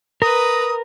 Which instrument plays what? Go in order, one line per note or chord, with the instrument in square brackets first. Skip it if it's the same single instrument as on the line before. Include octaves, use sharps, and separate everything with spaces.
[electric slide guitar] A#4 [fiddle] B4 A#5 [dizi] D#6